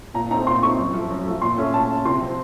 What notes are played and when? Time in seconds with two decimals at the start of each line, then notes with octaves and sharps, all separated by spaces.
0.14 A#2 A#5
0.31 A3 C4 D#4 A#5
0.47 A#2 C6
0.62 A3 C4 D#4 C#6
0.78 F#2
0.94 F3 A3
1.10 F#2
1.26 F3 A3
1.42 A#2 C6
1.58 A3 C#4
1.74 A#2 A5
1.90 A3 C#4
2.05 C3 C6
2.21 F3 C4